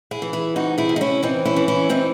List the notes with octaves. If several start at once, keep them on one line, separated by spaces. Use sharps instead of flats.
E4 G#4
E3
E4 G#4
C3 D#4 F#4
E4 G#4
C3
D#4
C#4 E4
E3 C4 D#4
C#4 E4
E3
C#4 E4
E3 C4 D#4